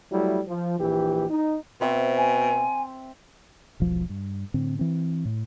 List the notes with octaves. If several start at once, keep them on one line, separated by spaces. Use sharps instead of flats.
F#3 G3 A3 E4
F3
A#1 E3 G4
D#4
B2 C4 E5
G#5
E1 B1 F3
G2
A2 D3 C4
E3 C4
A2